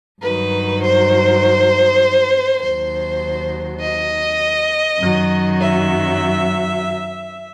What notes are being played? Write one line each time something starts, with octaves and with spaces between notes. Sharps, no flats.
G2 D#3 F#3 B4
C5
D#2 D#3 F#3 C5
D#5
F#2 D#3 F#3
E5